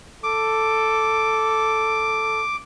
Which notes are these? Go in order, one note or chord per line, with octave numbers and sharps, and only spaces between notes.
A4 D6